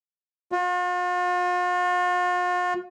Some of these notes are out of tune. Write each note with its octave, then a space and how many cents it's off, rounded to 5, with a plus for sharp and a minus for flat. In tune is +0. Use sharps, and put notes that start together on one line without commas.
F4 +45